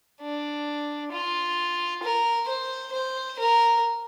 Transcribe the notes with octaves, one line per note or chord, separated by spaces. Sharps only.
D4
F4
A#4
C5
C5
A#4